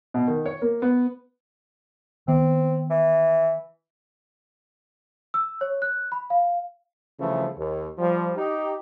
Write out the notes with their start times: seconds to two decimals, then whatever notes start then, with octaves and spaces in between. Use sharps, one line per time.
0.14 B2
0.28 D#3
0.46 C#5
0.62 A#3
0.82 B3
2.28 D#3 B3 C4
2.90 E3
5.34 E6
5.61 C#5
5.82 F#6
6.12 B5
6.30 F5
7.19 G2 C#3 E3 F3 A3
7.57 D#2
7.98 F3 G3
8.36 D#4 G4